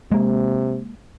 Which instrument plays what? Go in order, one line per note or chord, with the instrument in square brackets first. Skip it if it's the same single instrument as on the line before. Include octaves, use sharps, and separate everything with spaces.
[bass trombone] C3 [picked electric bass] G#3 A#3